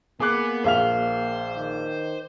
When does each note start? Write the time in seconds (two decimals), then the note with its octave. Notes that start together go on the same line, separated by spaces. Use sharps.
0.20 A#3 B3 G#4 D6 F#6
0.64 A#1 G#4 C5 E5 F5 F6 F7
1.56 D#3